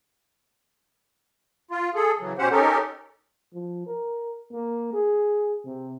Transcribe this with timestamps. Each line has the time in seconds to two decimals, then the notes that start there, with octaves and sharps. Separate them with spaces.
1.71 F4
1.95 G#4 A4
2.20 C#3 E3 F#3
2.38 B2 C#4 G4 C5 F#5
2.51 C#4 D#4 G4 A4 A#4
3.54 F3
3.86 A#4
4.52 A#3
4.93 G#4
5.65 C3